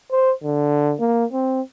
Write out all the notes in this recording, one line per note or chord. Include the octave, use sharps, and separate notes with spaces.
C5
D3
A#3
C4